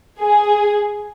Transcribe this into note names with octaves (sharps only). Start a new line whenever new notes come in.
G#4